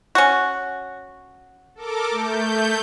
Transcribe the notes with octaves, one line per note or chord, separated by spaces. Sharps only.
C#4 F#4
A4 A#4 D6
A3 G6